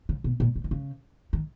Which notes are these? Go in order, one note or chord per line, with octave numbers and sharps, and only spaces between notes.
C#3
B2
A#2
B2
D#3
C#3
D#3